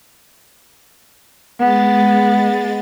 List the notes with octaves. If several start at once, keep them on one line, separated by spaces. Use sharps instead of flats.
G#3 B3 A6